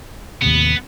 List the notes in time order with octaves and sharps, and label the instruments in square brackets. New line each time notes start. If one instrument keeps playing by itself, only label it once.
[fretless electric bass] D#2 A2 C3 [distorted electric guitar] B3